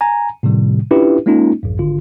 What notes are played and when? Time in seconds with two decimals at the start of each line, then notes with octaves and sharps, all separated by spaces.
0.01 G#5 A#5
0.43 A2 C3 D#3 G3
0.91 C#4 D4 E4 F4 G4 B4
1.26 G#3 A#3 C#4 D#4 F4
1.63 A#1 E2 G2
1.79 G#1 D3 F4